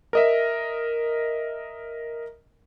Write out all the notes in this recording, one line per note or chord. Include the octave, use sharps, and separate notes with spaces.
A#4 D#5 E5